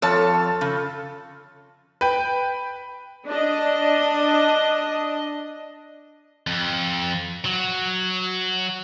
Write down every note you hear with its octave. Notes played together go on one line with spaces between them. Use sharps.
F2 F4 A4 C#5 A5
C#3
B4 G5
D4 D#5
F2
F#3